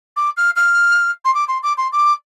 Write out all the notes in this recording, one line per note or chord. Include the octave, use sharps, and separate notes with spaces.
D6
F6
F6
C6
D6
C6
D6
C6
D6